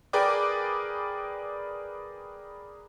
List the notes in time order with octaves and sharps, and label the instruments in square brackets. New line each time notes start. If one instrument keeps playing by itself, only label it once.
[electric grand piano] G#4 A#4 B4 D5 G5 D6